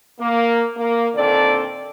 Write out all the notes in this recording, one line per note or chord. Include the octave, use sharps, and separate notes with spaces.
A#3
A#3
A#2 D3 D#3 C4 A4 D5